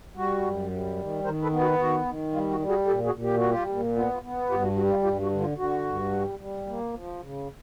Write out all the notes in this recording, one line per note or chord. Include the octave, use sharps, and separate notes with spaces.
G3 F#4
F#2
G3
D#3
D#3 A#4 C5
A4 B4
B3
F#4
D#3 F#4
D#3
G3 F4
F#4
G3
F#4 G#4
A#2 G4 A4
F#4 G#4
A#2
G4
G3 F#4
F4 G4
A#2
B3 F4
F4
B3
G2 F4 G4
F#4
G3 F#4
F4 G4
G2 F4 G4
F#4
D3
F4
D3 F#4
G2
G3
G3
A#3
F3
C#3